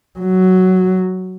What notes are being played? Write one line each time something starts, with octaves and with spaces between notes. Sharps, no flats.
F#3